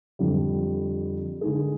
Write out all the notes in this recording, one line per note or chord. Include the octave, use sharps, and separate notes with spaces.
F2 D3 G3
D3 G#3 D#4 G#4